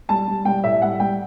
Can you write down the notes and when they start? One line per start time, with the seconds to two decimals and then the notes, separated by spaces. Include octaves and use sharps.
0.09 G3 A5
0.27 G3
0.45 G3 G5
0.64 A2 E5
0.82 G3 F#5
1.00 G3 G5